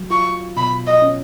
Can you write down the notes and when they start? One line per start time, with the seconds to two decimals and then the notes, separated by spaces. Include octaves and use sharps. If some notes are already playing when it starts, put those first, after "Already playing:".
Already playing: F#3
0.11 F4 C#6
0.57 B2 B5
0.87 D#5
1.02 C#4